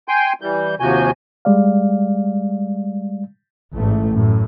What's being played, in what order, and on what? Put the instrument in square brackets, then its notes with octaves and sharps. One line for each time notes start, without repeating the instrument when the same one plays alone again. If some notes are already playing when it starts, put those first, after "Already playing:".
[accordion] G5 G#5 C6 G6
E3 G3 G6
D#2 C3 F3 F#4 G#5 G6
[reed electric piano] G3 G#3 D5 F5
[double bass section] A1 G#2 A3
F#2 A2